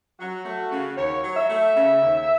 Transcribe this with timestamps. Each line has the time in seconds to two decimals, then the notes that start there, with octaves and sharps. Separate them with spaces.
0.19 F#3 F#4
0.45 A3
0.71 C#3
0.97 D#2 C#5
1.23 F#3
1.36 E5
1.49 A3
1.75 C#3
2.01 D#2